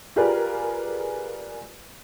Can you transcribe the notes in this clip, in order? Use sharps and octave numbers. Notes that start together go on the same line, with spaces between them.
F4 G4 G#4 A#4 B4 D5